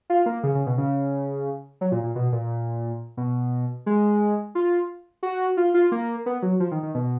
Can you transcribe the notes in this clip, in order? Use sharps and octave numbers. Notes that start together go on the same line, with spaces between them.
F4
A#3
C#3
C#3
B2
C#3
F#3
A#2
A#2
B2
A#2
B2
G#3
F4
F#4
F4
F4
A#3
B3
F#3
F3
D#3
D#3
B2